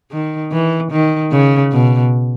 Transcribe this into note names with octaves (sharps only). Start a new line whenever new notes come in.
D#3
E3
D#3
C#3
B2